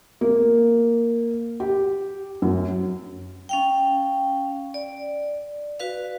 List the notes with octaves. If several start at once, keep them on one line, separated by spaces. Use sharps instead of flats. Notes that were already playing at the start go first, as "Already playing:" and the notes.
A#3
G4
F#2
C#4 F5 G5
D5
F#4 B4 F5